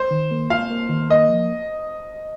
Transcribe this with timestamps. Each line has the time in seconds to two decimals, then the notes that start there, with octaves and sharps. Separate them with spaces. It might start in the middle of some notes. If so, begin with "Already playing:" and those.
Already playing: C5
0.11 D#3
0.31 A#3
0.50 F4 F5
0.70 A#3
0.89 D#3
1.10 A#3 D#5
1.29 F3